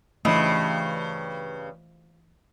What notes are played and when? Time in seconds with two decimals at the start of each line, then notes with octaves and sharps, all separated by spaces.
0.25 G2 C#3 E3 F3 A3 E4 D#5